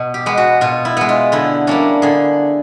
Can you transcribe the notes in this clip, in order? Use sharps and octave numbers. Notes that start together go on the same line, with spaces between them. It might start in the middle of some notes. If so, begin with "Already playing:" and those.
Already playing: B2
G4
G#3 B3
F#4
B2 F4
E4
G#3 B3
F4
D3 E4
G3 A#3 C#4 D4
D3 G#4